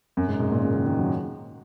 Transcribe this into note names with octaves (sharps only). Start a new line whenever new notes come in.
F#2
G#2
G#2
A#2
C#3
D#3
D#3
F#3